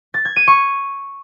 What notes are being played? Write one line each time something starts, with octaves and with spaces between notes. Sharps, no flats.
A6
G#6
D#7
C#6